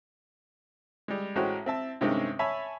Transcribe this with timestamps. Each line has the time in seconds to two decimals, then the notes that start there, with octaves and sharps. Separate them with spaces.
1.08 G3 G#3
1.35 A1 G#3 F#4 C5 C#5 G5
1.66 C4 E5 A5
2.01 G2 C3 D#3 G#3 C4 C#4
2.39 C#5 E5 G#5 A5 B5